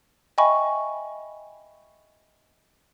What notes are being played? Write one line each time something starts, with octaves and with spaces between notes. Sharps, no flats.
D#5 E5 G5 G#5 B5 C#6